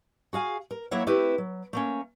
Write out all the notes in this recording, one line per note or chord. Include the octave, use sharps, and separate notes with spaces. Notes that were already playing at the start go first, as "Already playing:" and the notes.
F#4 G#4 F5 G#5
A#4
F#3 A#3 E4 C#5 E5 F#5
A3 C4 E4 G4 B4
F#3
A3 A#3 C#4